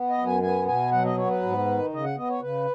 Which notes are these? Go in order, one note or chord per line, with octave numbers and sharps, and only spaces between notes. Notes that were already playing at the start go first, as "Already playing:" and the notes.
Already playing: B3
D#5
F#2
G#5
B3 G#5
B2 G#5
F#3 F#5
D#5
B3 C#5
B4
G#2
D#3
C#3 D#5
F#5
B3 D#5
C#5
C#3 B4